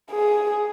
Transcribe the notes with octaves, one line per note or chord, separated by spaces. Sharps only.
G#4